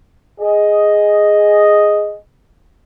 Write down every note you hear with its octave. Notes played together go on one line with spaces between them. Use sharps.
G#4 D#5